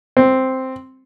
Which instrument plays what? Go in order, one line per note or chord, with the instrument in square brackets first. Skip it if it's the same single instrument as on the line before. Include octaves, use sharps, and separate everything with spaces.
[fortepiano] C4